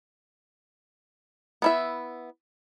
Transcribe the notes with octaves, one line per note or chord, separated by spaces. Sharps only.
B3 E4 E5